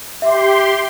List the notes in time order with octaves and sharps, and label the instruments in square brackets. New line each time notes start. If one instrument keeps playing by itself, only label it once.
[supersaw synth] G4 C6 [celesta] E5